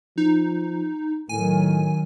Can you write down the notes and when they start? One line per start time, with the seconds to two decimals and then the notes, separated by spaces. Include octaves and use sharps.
0.18 F3 D#4
1.29 A2 D#3 F#3 G#5